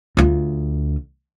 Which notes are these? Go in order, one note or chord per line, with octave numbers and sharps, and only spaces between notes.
D2 F4